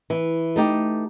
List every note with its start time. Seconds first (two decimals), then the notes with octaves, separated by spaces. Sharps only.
0.10 E3
0.56 A3 D#4 G4